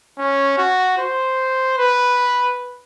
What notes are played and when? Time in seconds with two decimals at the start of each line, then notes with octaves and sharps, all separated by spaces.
0.19 C#4
0.58 F#4
0.98 C5
1.78 B4